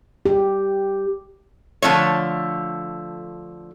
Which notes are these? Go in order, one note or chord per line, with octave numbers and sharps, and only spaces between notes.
G4
D3 F3 A3 C#5